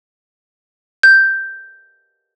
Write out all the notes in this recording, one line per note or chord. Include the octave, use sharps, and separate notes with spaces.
G6